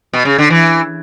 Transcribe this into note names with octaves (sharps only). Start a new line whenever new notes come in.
B2
C#3
D3
E3